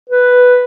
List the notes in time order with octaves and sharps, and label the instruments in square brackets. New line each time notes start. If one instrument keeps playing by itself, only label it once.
[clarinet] B4